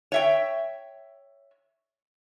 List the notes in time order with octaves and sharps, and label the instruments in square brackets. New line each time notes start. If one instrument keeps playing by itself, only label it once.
[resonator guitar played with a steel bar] C#5 E5 G5